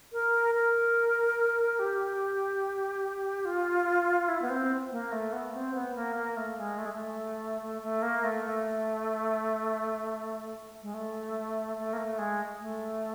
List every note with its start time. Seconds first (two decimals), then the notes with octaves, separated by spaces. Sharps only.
0.13 A#4
0.55 A#4
1.79 G4
3.45 F4
4.28 E4
4.42 B3
4.50 C4
4.91 A#3
5.12 A3
5.33 B3
5.53 C4
5.74 B3
5.95 A#3
6.16 A#3
6.37 A3
6.58 G#3
6.78 A3
6.86 G#3
6.93 A3
7.62 A3
7.82 A3
8.02 A#3
8.24 A3
8.44 A3
10.82 G#3
10.94 A3
11.77 A3
11.93 A#3
11.98 A3
12.19 G#3
12.60 A3